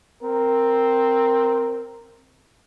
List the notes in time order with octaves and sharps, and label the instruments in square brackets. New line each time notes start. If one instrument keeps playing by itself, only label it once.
[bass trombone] C4 [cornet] A#4